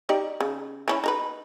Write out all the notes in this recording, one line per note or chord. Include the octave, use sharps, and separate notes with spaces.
D#4 G4 D5
C#3
E3 C#4 E4
D#4 A#4 B4